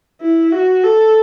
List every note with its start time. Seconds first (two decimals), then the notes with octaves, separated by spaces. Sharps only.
0.21 E4
0.53 F#4
0.84 A4